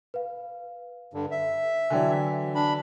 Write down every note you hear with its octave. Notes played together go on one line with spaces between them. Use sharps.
B4 F5
G2 D3
E5
D3 E3 F#3 D5 G5 G#5
D4 B5